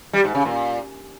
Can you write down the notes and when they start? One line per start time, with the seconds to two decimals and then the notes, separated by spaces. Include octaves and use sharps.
0.13 G3
0.24 G#2
0.35 C#3
0.45 A#2